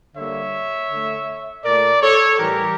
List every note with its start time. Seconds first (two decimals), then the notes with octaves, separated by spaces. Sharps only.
0.16 D3 G3 A#3 C#5 E5
0.90 D3 A3
1.64 A#2 A3 A#4 D5
2.01 A4 C#5
2.38 A2 E3 G3 G4 A#4